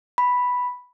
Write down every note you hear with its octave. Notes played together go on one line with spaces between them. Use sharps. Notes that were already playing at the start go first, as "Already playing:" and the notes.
B5